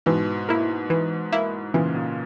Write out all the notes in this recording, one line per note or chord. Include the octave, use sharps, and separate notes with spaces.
G#2 B2 E3
A#3 E4
E3
A#3 E4
A#2 C#3 E3
A#2